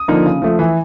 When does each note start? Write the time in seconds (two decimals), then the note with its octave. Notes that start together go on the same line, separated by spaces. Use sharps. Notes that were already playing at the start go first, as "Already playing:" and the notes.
Already playing: D#6
0.08 D3 F3 A#3 D#4
0.26 C#3
0.42 F3 A3
0.59 E3